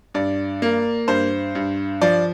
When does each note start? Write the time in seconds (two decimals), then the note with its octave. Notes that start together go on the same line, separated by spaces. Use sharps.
0.14 G2 D5
0.62 A#3
1.07 G2 C5
1.55 G2
2.02 F3 D5